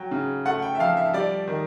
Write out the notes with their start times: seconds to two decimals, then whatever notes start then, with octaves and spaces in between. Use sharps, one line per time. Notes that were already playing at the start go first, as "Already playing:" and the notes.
Already playing: F#3 G5
0.11 C#3
0.46 A3 F#5
0.62 G5
0.75 E5
0.79 F3 F5
0.97 E5
1.13 G3 D5
1.47 D#3